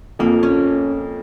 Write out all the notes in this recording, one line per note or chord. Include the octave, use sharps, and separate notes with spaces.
F2 F3 A#3
C#4